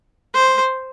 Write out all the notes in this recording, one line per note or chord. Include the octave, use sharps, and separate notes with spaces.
C5